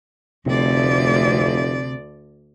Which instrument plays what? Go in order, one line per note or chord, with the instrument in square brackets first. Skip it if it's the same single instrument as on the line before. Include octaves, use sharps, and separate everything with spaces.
[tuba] F1 [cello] D2 D5 [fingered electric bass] C3